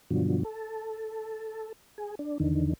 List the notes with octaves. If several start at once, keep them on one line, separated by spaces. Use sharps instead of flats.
G2 B2 D3 F3 F#3
A4
G#4
D4
E2 D3 D#3